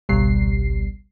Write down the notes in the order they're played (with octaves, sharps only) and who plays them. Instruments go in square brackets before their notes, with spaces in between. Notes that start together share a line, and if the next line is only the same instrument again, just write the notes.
[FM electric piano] G#1 C#2 B2 G3 C7